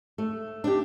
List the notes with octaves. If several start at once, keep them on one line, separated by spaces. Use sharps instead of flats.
A3
D4 G4